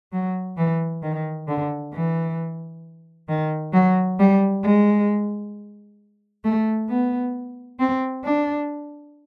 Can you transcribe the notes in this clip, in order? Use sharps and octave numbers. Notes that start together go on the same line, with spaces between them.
F#3
E3
D#3
D3
E3
D#3
F#3
G3
G#3
A3
B3
C4
D4